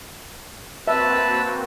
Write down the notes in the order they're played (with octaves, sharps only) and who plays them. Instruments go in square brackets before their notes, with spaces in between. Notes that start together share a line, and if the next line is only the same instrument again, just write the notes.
[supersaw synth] A#3 C4 F#4 [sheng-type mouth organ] B4 A5 [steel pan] E5